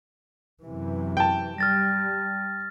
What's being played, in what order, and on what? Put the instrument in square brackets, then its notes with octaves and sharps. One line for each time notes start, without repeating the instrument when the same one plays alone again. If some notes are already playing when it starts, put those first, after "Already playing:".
[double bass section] F#2 C3 E3
[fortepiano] G5 A5
[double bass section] G3 [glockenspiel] F6 A6 A#6